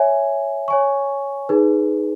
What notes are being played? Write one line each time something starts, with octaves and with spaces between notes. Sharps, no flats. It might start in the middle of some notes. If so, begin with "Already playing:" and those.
Already playing: C#5 E5 G#5
C#5 G#5 C#6
D#4 G#4 B4